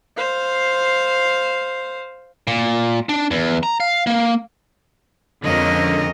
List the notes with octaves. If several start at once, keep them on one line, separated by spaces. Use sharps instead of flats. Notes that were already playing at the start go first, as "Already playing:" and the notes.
C5 F5
A#2
D4
E2
A#5
F5
A#3
F2 D3 G#3 C#4 A#4 D#5